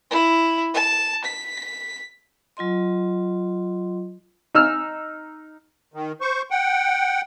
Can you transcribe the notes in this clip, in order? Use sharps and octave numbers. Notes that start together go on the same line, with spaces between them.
E4
A5
B6
F#3 F4 D#5 C6
D#4 E6 F6
D#3
C5 C#6
F#5 G5